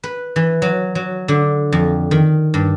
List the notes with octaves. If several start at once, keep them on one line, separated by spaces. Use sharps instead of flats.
B4
E3
F#3
F#3
D3
F2
D#3
G2